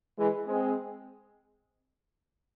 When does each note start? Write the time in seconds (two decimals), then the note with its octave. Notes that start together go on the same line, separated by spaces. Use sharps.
0.18 E3 G#3
0.47 G#3 C4